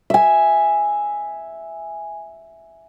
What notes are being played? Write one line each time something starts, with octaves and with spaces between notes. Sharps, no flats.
E5 G#5